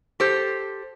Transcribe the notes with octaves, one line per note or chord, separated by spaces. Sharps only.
G4 A4 C5